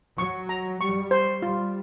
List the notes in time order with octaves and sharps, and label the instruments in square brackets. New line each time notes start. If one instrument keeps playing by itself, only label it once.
[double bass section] F#3 [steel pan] C#6
[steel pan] A#5
[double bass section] G3 [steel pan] C#6
[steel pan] C5
[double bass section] G3 [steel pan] F4